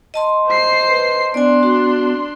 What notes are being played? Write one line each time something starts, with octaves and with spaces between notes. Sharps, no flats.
D#5 A5 C6
C5 C7
B4
B3 D4 D5 G#5 C6
F#4